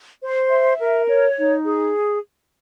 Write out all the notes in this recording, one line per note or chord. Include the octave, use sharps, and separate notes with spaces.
C5
E5
A#4
C#5
D#4
G#4